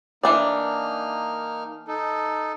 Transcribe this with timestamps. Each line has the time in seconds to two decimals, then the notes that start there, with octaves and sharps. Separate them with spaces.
0.23 E3 A#3 D4 D#4 D5 F6
1.88 D#4 A4